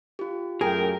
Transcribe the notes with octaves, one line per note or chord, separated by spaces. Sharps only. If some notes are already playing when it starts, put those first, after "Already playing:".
F4 G4
F#2 A3 G#4 A#4 G5